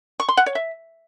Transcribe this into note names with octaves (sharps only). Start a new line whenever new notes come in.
C#6
C6
F#5
C#5
E5